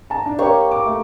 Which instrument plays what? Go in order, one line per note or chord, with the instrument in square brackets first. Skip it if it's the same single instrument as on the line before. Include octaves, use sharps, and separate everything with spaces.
[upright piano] A5 A#5
D4
[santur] A#3 G4 C#6 [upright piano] C5 C#5
[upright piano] D6
A3